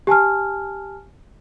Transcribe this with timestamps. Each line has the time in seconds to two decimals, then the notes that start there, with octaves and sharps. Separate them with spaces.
0.07 G4 G#5 A5 F6